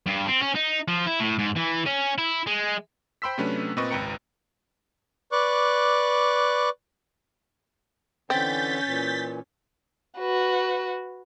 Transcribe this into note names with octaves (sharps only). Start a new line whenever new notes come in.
G2
C4
C#4
D#4
F3
E4
A2
G#2
E3
C#4
E4
G#3
C5 G5 B5 C6 E6 B6
C3 F#3 A3 C#4 D4 B4
A#2 C4 B4 D#5 C#6
G#1 C#2 B4 G5 A#5 C#7
B4 D5 C#6 D6 F#6
D3 E3 C4 C#4 G6 A6 B6
A#2 E3
F#4 B4